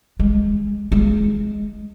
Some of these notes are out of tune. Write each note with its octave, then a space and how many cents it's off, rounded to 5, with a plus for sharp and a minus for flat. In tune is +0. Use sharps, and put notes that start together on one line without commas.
G#3 -10
G#3 +10